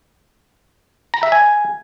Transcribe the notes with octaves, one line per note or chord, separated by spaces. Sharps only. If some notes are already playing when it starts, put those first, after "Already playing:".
A#5
E5
G#5